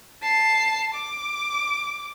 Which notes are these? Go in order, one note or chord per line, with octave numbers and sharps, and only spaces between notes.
A5 C7
D6